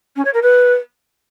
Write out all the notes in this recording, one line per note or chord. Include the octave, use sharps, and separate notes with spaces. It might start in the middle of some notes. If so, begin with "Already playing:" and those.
C#4
C#5
A#4
B4